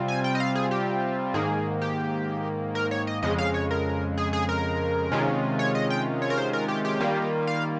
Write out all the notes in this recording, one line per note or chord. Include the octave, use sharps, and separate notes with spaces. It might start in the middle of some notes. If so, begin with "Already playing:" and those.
Already playing: C3 G3 C4 F4
G#5
G5
D#5
F5
G#4
G4
G#2 D#3 A#3 G#4
G4
A#4
C#5
D#5
F2 C#3 G#3 D#5
F5
C#5
A#4
G#4
G#4
A#4
C3 D#3 G#3 C#4 F4
C#5
D#5
G5
C#5
A#4
C5
A#4
G4
G4
D#3 G3 A#3 F4
F5